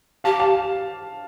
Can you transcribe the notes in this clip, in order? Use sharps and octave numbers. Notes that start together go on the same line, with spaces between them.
G4 F5 A5
F5 A5